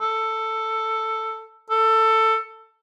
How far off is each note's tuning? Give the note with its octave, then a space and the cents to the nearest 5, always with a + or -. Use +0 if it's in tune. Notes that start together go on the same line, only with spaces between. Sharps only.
A4 +10
A4 +15